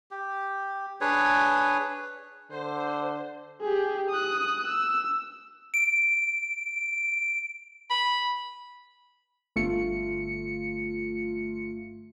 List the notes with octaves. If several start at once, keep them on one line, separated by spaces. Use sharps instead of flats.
G4
D4 G#4 B4 C#5
D3 C5
G4 G#4
D#6 F#6
E6
D7
B5
G1 A3 F4 C#7